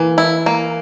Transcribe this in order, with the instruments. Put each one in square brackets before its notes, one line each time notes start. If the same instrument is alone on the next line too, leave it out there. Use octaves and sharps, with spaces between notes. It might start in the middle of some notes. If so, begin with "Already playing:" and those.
Already playing: [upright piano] E3 [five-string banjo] A#3
[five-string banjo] E4
A#3